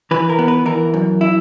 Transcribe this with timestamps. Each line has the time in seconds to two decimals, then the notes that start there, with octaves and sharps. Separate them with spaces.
0.11 E3 B4
0.30 A#4
0.39 B3
0.48 B4
0.66 E3 A#4
0.94 F#2
1.21 E4